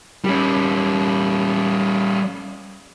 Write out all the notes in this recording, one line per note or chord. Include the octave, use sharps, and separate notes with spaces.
G3 C#4